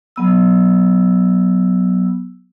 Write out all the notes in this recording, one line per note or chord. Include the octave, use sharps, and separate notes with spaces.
F#3 B3 E6